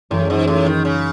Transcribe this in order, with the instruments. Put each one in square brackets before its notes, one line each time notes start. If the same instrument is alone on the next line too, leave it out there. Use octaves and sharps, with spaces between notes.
[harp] F#2 E3 G#3 [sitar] A2
[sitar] G#2
A2
D#3
C#3